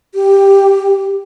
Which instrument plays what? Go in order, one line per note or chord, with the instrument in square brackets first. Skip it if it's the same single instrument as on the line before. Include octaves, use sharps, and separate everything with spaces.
[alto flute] G4